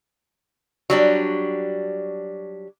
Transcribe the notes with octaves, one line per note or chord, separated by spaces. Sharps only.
F#3 G3 D4